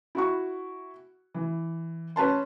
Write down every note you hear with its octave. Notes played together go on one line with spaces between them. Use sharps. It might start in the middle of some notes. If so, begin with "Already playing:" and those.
E4 F#4 C#6
E3
C#4 B4 A5 C6